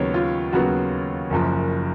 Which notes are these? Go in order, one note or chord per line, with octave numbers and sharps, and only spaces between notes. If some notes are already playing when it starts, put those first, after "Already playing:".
Already playing: D#2 C#3 F#3 B3 C#5
F4
D#2 C#3 F#3 B3 F#4
F#1 F#2 F3